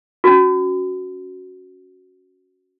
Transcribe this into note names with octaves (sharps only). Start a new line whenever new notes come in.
C#4 F#4